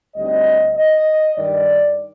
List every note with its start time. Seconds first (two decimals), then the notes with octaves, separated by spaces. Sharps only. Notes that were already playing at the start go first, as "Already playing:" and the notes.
0.15 D2 D3 G3 C4 D#4 D#5
0.76 D#5
1.36 G2 D#3 G3 D5